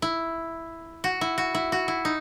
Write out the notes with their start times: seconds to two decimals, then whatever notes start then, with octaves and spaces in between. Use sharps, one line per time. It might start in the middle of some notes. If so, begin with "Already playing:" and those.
0.02 E4
1.04 F#4
1.21 E4
1.38 F#4
1.55 E4
1.72 F#4
1.88 E4
2.05 D#4